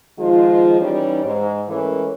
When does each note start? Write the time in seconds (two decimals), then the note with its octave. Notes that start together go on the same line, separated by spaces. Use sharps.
0.19 D#3 F3 G#3 F4
0.79 E3 G3 C#4 D#4
1.24 G#2
1.69 E3 G#3 A3 C#4 A#4